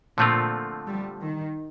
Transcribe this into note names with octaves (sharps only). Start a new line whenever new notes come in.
A#2 D3 F3 A3 C4 F4
G3
D#3